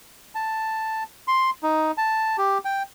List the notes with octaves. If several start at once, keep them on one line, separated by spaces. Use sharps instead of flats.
A5
C6
D#4
A5
G4
G5